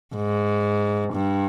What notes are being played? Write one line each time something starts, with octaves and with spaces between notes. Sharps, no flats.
G#2
G2